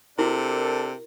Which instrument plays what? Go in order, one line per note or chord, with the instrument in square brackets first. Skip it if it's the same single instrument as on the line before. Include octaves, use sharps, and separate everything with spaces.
[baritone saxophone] C3 [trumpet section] D4 A4 [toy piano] E4 F#4 [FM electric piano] A#4